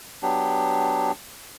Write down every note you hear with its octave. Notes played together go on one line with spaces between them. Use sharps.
F#3 B3 D4 G4